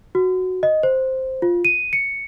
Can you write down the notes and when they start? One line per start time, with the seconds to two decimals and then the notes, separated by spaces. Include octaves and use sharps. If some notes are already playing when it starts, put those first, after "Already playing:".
0.15 F#4
0.63 D#5
0.83 C5
1.42 F4
1.65 D#7
1.93 C#7